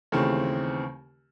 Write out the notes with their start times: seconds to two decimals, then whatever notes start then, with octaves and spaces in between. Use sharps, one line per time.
0.12 D#2 C#3 E3 A3 C4